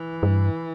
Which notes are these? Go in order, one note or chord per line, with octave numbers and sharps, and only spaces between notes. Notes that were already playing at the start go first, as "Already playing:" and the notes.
Already playing: E3
G2